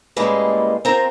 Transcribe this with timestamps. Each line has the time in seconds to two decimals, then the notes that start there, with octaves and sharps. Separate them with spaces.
0.16 A2 C#3 G3 G#3 A#3 B4
0.85 C4 F4 A#4 G5 A#5